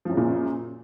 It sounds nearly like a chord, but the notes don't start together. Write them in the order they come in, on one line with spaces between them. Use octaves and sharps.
F3 F#2 C#3 A#2